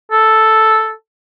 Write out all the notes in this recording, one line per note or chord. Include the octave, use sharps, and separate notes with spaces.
A4